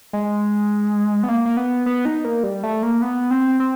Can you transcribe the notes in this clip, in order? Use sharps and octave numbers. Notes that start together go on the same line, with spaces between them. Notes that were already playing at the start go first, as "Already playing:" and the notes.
G#3
B3
A#3
A#3
B3
B3
D#4
A#3
G3
A3
A#3
B3
C4
C4